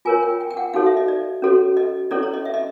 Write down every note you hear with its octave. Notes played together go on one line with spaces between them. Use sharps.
F4 A#4 C#5 G#5
G5
G5
G5
F#5
D#4 F#4 A4 C#5 F5
E5
D#5
D5
C#4 F#4 A4 C#5
D#5
C#4 E4 A4 C#5 D5
C#5
D#5
E5
D#5